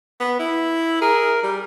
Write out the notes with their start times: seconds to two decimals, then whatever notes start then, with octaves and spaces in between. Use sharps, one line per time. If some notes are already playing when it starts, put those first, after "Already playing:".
0.20 B3
0.39 E4
1.01 G#4 A#4
1.43 G3